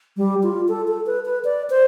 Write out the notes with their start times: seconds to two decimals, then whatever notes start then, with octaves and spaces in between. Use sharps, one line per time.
0.17 G3
0.43 F4
0.68 A4
0.88 A4
1.06 B4
1.25 B4
1.45 D5
1.70 C5